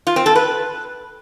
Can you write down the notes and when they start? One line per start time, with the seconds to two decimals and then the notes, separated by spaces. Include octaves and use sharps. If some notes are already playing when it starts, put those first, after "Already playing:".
0.07 F4
0.16 C4
0.26 A4
0.35 B4